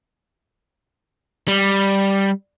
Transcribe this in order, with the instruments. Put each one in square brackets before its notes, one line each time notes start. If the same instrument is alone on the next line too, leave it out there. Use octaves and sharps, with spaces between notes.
[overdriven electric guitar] G3